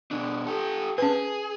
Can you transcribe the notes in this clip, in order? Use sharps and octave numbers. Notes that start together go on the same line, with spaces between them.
B2 D4
G4 A4
C#4 G#4 B4